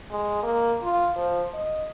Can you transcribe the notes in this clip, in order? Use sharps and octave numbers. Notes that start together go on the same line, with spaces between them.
G#3
A#3
F4
F3
D#5